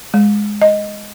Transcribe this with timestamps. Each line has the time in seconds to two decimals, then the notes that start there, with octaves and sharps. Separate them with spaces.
0.14 G#3
0.62 D#5